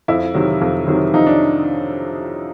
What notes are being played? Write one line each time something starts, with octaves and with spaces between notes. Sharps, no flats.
F2 E4
C3 D#3 F#3
F2
C3 D#3 F#3
F2 D#4
D4